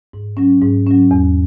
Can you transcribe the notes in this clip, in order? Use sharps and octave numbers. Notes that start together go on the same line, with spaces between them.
G#2
F#3 C#4
G#2
F#3 C#4
E2